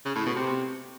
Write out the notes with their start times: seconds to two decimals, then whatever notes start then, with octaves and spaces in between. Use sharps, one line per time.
0.05 C#3
0.15 A2
0.26 B2
0.36 C3